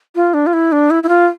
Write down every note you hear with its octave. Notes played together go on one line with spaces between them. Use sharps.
F4
D4
F4
E4
D4
E4
E4
F4